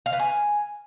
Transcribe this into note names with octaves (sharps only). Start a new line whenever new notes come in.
F5
B4
G#5